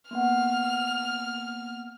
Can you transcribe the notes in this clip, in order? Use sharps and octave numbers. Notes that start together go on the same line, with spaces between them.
A#3 B3 F#5 F6